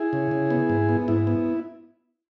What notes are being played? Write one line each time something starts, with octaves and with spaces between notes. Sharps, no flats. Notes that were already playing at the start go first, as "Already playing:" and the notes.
Already playing: E4 G#4
C#3
C#3
B3
G#2
B3
G#2 E4
B3